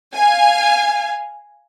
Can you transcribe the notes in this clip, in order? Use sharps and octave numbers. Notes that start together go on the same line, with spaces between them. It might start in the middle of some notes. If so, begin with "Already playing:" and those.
F5 G#5